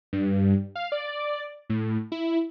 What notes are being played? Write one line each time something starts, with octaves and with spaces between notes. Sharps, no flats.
G2
F5
D5
A2
E4